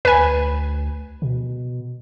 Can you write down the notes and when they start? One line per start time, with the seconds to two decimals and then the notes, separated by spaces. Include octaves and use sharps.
0.05 D2 B4 G#5
1.22 B2